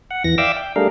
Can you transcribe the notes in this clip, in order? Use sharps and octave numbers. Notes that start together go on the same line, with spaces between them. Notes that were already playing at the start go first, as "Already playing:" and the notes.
F#5
E2 E3 A#6
D5 E5 F5 G5 D6 E6
G5
G3 A3 D4 G#4 A#4 F5